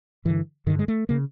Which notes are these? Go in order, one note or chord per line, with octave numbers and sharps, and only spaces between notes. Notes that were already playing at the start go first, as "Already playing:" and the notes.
G2 D3 E3
G2 D3 D#3
G#3
A3
C#3 A#3